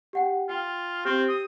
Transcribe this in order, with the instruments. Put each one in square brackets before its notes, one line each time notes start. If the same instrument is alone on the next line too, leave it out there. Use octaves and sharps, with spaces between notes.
[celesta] G4 F#5 G5
[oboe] F4 [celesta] G5
[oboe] C4 [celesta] G4
[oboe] D#6